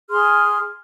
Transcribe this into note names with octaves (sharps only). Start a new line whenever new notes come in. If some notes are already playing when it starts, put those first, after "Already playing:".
G#4 C6 F6